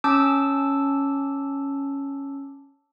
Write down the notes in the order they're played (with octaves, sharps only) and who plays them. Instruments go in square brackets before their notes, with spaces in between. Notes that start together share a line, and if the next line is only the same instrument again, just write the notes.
[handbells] C#4 A5 D6 E6